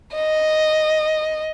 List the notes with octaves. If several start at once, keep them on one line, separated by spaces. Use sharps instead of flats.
D#5